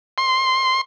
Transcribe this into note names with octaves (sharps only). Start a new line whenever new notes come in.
C6